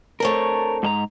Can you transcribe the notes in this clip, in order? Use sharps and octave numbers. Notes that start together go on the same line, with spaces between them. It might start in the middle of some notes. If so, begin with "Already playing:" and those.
A3 C4 D4 A#4 C#5
G#2 A4 A#5